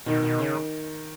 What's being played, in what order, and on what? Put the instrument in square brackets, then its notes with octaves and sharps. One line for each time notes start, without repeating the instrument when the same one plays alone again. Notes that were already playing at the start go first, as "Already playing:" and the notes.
[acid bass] B2 [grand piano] D#3
[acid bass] B2
C#3